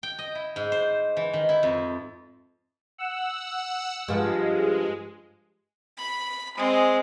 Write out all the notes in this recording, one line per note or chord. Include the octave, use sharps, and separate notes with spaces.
G5
D#5
E4
G#2
C5
E3
D#3
E4
F2
F#5 E6
G2 F3 G#3
B5
G#3 C4